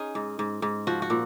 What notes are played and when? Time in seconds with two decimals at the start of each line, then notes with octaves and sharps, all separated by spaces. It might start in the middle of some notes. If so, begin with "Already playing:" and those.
Already playing: C#4 D#4 G#4
0.15 G#2
0.39 G#2
0.62 G#2
0.87 F3 F#4
1.02 F#4
1.10 A#2